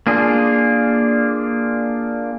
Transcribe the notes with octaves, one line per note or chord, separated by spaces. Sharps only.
A#3 D4 F4 G#4